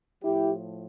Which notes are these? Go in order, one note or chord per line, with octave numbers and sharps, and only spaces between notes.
A2 F3 E4 G4